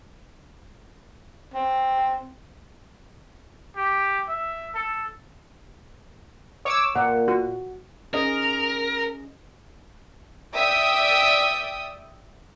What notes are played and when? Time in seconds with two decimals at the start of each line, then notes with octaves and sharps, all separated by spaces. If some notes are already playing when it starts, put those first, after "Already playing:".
1.54 C4
3.77 G4
4.29 E5
4.75 A4
6.65 C#5 D6 E6
6.95 A#2 F#5
7.28 F#4
8.13 C#4 G#4 A#4 D#5
10.56 D5 E5 G5 D#6